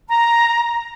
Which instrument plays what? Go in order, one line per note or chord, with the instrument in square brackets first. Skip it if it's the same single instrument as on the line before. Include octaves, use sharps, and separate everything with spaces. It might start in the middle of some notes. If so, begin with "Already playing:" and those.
[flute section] A#5